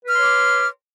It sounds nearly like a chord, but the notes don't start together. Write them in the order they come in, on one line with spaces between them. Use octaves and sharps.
B4 F6 C6 C#5 D6